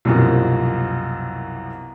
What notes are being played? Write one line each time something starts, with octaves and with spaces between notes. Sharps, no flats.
C2 F#2 B2 F3 A#3